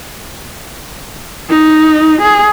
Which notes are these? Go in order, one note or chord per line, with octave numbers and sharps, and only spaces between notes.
D#4
G#4